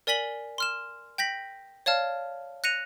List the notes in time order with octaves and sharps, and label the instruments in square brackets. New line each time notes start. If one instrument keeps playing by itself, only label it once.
[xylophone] A#4 D5 G#5 B6 F#7 G7
C6 F6 E7
G5 G6 A#6 B6 F#7
C#5 D5 F5 A5 F6
F#6 A#6 C#7 D#7 F7